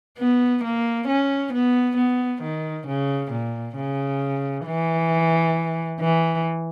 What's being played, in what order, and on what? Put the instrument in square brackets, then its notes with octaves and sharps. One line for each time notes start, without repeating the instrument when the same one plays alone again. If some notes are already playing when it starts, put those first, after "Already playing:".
[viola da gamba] B3
A#3
C#4
B3
B3
D#3
C#3
A#2
C#3
E3
E3